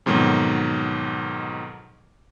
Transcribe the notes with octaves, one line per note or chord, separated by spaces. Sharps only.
F2 G#2 B2 D#3 F#3